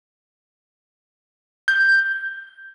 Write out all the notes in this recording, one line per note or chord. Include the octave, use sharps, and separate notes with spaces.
G6